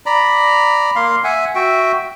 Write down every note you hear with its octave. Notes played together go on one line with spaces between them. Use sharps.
D5 A#5 B5
A#3 F5 C6
E5 F#5 G#5
F#4 E5 G5